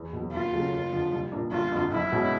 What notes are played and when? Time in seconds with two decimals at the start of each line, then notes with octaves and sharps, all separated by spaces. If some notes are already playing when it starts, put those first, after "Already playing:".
Already playing: E2
0.13 B2 F#3
0.32 D#2 F4
0.53 C#3 F#3 A3
0.73 F#1
0.92 F2 D3 F3
1.12 C2
1.32 A#2 F3 A#3 D4
1.52 G1 F4
1.72 F2 D3
1.92 B1 E4
2.12 B2 G#3 C#4 F#4